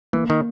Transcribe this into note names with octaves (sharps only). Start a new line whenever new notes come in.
E3 A#3
D#3